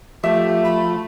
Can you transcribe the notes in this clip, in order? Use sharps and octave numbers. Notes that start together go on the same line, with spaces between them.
F3 A3 G4 E5
B5